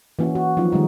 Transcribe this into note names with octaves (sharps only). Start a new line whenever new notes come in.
E3 A#3 C#4 F#4
F#4
F3 F#3 C4 D#4 F4
D#3 G3 G#3 D#4